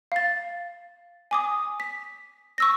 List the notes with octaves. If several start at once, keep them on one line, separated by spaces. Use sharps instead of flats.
F5 A6
G#5 D6 D#6
B6
C#6 E6 A#6